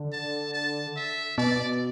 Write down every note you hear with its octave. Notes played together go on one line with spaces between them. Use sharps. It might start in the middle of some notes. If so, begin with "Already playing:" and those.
Already playing: D3
A5
A5
E5
B2 D5